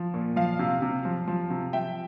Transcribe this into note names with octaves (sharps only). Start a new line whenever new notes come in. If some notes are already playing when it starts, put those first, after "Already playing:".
Already playing: F3
A#2
F3 F5
C3
C3
F3
F3
C3
F3 E5 G5